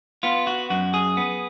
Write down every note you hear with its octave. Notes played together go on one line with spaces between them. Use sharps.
B3 F4
F#4
F#2 F#4
G#4
B3